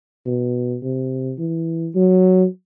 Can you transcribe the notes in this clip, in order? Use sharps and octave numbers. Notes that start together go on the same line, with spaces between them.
B2
C3
E3
F#3